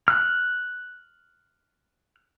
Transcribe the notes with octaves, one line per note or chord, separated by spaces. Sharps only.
F6 F#6